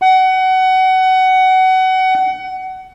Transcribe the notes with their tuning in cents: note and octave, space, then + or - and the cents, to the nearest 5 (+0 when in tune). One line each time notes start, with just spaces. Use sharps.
F#5 +25